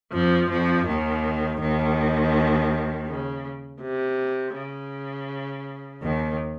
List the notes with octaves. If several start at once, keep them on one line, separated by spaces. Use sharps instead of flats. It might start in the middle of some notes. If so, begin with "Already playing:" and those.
F2 F3
F2 F3
D#2 D#3
D#2 D#3
C#3
C3
C#3
D#2 D#3